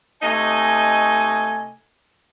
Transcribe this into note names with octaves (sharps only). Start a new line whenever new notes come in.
C3 A3 D#4 D#5 G#5